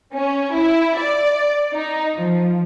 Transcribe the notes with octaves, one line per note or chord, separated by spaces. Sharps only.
C#4
E4
D5
D#4
F3